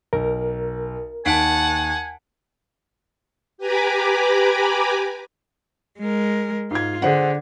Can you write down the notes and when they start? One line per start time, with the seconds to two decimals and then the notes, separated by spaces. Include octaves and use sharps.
0.13 B1 A#4
1.26 D#2 F#5 G#5 A5 B6 D7
3.58 G4 B4 G#5 A#5 B5 D6
5.99 G#3 A#4
6.71 G#2 F4 G#6
7.02 D3 G#4 C5 F#5